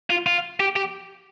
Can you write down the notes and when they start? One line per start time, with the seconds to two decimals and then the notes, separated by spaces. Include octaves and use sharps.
0.10 F4
0.26 F4
0.60 G4
0.76 G4